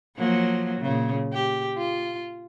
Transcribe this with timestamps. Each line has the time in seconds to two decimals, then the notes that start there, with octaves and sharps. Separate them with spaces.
0.17 F3 F#3 A#3
0.81 A#2 C#3
1.33 G4
1.78 F4